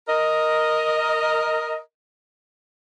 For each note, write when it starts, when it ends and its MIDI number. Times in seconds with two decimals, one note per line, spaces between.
0.08 1.77 70
0.08 1.77 75